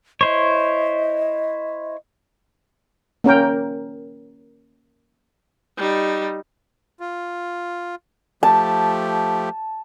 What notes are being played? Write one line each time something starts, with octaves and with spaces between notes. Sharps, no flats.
E4 C5 C#5 D#5
A#3 C#4 A#4 G5
G3 D#4
F4
F3 A3 G4 A5